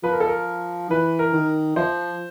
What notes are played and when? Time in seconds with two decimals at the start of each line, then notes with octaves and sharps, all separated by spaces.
0.03 F3 B4
0.12 A#4
0.20 A4
0.28 A#4
0.90 E3 B4
1.19 A#4
1.33 D#3
1.76 F3 C5